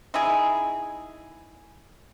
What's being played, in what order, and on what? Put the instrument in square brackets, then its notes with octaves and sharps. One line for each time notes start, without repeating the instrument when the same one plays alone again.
[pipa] D#4 E4 G#4